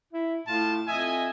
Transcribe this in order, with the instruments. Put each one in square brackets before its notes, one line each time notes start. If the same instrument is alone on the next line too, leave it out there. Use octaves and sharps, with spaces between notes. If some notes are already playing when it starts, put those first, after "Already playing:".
[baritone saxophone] E4
[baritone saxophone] A2 [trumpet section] F4 A5
[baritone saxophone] F2 [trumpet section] D#5 E5 G#5